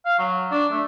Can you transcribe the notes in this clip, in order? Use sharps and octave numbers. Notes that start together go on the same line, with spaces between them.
F5
F#3
D4
A3